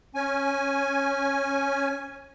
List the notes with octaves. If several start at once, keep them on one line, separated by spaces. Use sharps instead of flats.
C#4 G#5